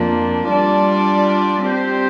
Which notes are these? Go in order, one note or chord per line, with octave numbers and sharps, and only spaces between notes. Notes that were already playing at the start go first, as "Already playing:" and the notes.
Already playing: F2 F3 A#3 D4
G3 D4 F4 D5
G3 C4 G4 C5